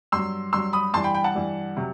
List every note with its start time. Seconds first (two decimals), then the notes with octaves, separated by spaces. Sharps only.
0.12 G2 F#3 C6 E6
0.53 G2 F#3 C6 E6
0.73 B5 D#6
0.94 G2 E3 G3 A5 C6
1.04 G5 B5
1.14 G5 B5
1.24 F#5 A5
1.35 G2 E3 G3
1.77 C3 F#3